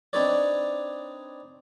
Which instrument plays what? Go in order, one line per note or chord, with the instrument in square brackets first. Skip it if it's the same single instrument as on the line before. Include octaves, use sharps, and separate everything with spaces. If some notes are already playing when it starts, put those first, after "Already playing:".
[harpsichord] C4 D4 D#4 B4 C#5 D5